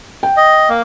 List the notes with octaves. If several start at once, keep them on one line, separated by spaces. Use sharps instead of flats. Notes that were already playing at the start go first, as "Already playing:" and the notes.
G5
D#5
A#3